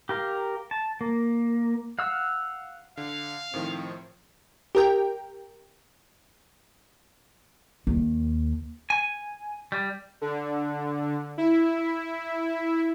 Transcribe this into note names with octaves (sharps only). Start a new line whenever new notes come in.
G4 A#4 F5
A5
A#3
F5 F#5 E6
D3 F5
A2 D#3 F3 C4
G4 A#4 G5
D#2
G#5
G3
D3
E4